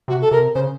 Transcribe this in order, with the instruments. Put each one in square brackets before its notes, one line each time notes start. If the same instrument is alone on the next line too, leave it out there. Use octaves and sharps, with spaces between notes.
[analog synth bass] C3 [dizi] F#4
[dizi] A4
[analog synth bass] C3 [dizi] A#4
[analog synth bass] C#3 [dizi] C5